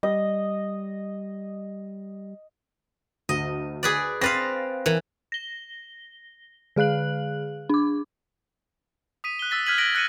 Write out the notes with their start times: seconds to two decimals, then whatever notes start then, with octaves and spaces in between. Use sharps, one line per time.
0.03 G3 D#5
3.29 D2 D#5
3.83 G#4 B4 D5
4.21 C4 B4 F5 A6 A#6
4.86 E3 A#4
5.32 A#6 G7
6.76 D3 G#4 F5 F#6 F#7
7.69 D4 D6
9.24 D#6 B6 D#7
9.39 F#6 G7
9.51 E6 A6 B6
9.66 F6 F#6 G#6 B6 D#7 F#7
9.78 F#6 A#6 D7 F#7
9.95 F#6 A#6 C#7 D#7 F#7